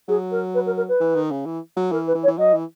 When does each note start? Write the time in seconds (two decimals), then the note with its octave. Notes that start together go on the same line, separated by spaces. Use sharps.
0.08 F#3 G#4
0.31 A#4
0.54 B4
0.66 A#4
0.76 A#4
0.88 B4
1.00 E3
1.15 D#3
1.31 C#3
1.46 E3
1.76 F#3
1.92 E3 A#4
2.07 B4
2.15 E3
2.23 C#5
2.28 E3
2.38 F#3 D#5
2.53 E3